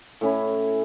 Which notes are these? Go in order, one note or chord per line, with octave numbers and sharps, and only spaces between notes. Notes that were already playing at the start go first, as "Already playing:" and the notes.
A2 C#4 E4